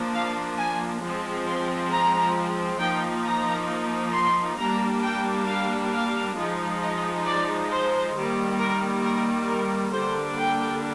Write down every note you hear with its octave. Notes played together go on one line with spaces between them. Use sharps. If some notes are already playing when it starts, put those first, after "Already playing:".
Already playing: F3 A#3 D4
F5
G#5
F3 G#3 C4
C6
A#5
F3 A#3 D#4 G5
A#5
C6
G3 A#3 D4 A#5
G5
F5
F5
F3 G#3 D#4
D#5
D5
C5
D#3 G3 A#3
A#4
A#4
A#4
D3 G3 A#3 D4 C5
G5